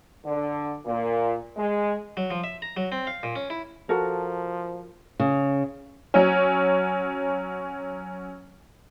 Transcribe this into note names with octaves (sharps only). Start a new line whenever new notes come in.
D3
A#2
G#3
F#3
F3
E5
A#5
F#3
C4
F5
A#2
C#4
E4
F3 F#4 A4 A#4
C#3
F#3 C#4